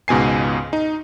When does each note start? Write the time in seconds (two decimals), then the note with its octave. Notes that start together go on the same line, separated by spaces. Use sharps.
0.08 C#2 G#2 B2 G#5 C7
0.73 D#4